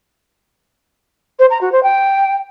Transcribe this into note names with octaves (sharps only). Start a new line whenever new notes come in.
C5
A#5
F#4
C5
G5